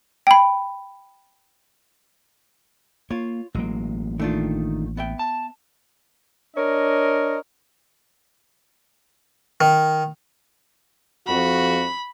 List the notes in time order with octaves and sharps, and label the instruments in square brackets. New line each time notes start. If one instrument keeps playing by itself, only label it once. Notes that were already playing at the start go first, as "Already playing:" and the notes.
[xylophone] G5 B5
[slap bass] A#3 [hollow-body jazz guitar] F4 C#5
[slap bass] A1 A#3 [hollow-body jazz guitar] F#3 G#3
[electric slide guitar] D#3 [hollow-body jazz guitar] A3 D4 F4
[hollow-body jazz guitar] B3 E5 G5
[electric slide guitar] A5
[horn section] D4 A#4 C#5 D#5
[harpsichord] D#3
[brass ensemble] F2 F#4 [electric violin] B5